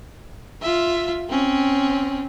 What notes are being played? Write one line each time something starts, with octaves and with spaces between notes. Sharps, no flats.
F4 E5
C4 C#4